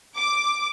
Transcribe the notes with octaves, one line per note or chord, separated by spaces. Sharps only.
D6